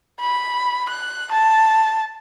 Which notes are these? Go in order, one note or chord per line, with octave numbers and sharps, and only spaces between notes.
B5
F#6
A5